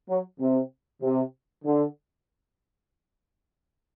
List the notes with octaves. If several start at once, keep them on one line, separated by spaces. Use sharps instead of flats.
F#3
C3
C3
D3